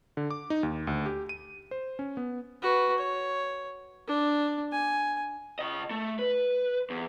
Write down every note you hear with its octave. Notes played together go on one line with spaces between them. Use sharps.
D3
D6
D#4
D#2
D2
G4
D#7
C5
C#4
B3
F#4 B4
C#5
D4
G#5
C#3 D#5
A3
B4
E2